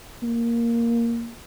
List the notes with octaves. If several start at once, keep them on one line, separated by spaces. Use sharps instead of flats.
A#3